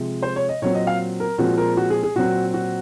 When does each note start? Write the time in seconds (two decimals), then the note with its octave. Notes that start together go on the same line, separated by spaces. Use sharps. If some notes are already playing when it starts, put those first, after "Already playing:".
Already playing: C3 F3 G#3
0.22 C5
0.36 C#5
0.49 D#5
0.62 A#2 F#3 C4 C#5
0.75 D#5
0.87 F5
1.20 A#4
1.38 A#2 F3 G#3 C4 F#4
1.58 A#4
1.77 F#4
1.90 G#4
2.03 G#4
2.15 A#2 F#3 C4 F#4
2.54 F#4